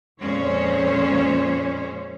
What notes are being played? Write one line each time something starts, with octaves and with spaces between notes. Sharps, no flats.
F2 A#2 G#3 C#4 C5 C#5